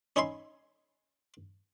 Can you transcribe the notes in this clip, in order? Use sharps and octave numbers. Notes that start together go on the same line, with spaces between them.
C#4 D#4 C#5 E5 B5 C6